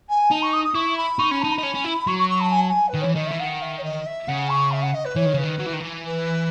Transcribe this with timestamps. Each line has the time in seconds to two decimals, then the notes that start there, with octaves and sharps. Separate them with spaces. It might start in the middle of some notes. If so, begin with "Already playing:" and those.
0.09 G#5
0.31 D#4 A5
0.42 C#6
0.53 D#6
0.64 D#6
0.75 E4 C#6
0.97 B5
1.19 D#4 C#6
1.30 C#4 B5
1.41 D#4 A5
1.52 B5
1.58 D#4
1.63 C#4
1.75 C#4
1.85 E4
2.07 F#3 C#6
2.18 C#6
2.29 C#6
2.40 A5
2.51 G#5
2.60 A5
2.69 G#5
2.88 B4
2.95 D#3
3.01 E3 C#5
3.13 D#3 D#5
3.26 E3 E5
3.39 D#3 F#5
3.61 E5
3.78 C#5
3.83 D#5
4.06 E5
4.27 C#3 F#5
4.49 C#6
4.71 E5
4.82 F#5
4.94 D#5
5.05 B4
5.16 E3 C#5
5.26 D#3
5.34 C#3 B4
5.44 D#3
5.59 F#3
5.66 E3
5.73 D#3
5.80 E3
6.04 B4